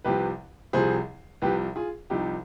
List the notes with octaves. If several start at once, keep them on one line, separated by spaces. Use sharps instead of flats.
C2 C3 F3 G4 B4
C2 C3 F3 G#4 C5
C2 C3 F3 G4 B4
F4 G#4
C2 C3 F3 D#4 G4